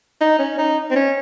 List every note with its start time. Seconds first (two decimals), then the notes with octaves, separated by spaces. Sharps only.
0.21 D#4
0.39 C#4
0.58 D#4
0.91 C4
0.95 C#4